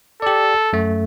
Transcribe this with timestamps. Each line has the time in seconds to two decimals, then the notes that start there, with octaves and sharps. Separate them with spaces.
0.22 G4 A4 D5
0.73 F#2 A3